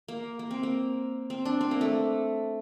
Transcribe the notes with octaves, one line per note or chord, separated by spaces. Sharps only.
A#3
A#3
C4
A#3
C4
D4
C4
A#3
A3